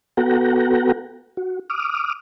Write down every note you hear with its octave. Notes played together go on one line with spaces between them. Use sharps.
B3 F#4 A4 F#5 G5 A#5
F#4
D6 D#6 F6